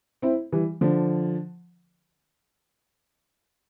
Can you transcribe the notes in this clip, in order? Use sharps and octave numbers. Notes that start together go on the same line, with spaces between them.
C4 E4
E3 G3
D3 F3